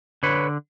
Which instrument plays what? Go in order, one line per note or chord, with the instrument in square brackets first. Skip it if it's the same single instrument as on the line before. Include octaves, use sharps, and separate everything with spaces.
[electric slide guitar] D3 B4 C#5